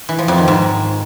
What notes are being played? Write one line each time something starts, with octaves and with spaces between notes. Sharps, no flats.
E3
F3
F2
D#3
G#2